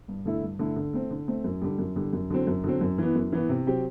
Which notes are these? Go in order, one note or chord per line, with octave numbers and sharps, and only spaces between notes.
G2
D3 A3 E4
G2
D3 A3 E4
D3
A3 C4
D3
A3 C4
F#2
D3 G3
F#2
D3 G3
F#2
D3 F#3 C4
F#2
D3 F#3 C4
F#2
E3 B3
F#2
E3 B3
C3
F#3 C4 G4